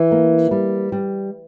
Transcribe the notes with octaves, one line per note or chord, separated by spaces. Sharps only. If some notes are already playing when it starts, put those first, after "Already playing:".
Already playing: E3
A#3
G3
G3